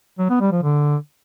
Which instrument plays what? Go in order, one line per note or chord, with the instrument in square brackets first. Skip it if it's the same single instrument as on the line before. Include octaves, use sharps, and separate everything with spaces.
[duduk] F#3
B3
G3
F3
D3